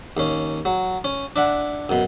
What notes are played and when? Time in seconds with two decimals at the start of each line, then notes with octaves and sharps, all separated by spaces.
0.17 D#2 C#4
0.65 F#3
1.04 C#4
1.36 D4 E5 F#5
1.89 F#2 B2